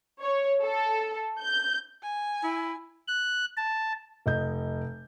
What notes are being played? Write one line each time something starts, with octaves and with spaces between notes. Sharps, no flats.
C#5
A4
G6
G#5
E4
F#6
A5
F1 D#5 G6